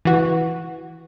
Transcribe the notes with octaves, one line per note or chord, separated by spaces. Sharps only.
E3 F#4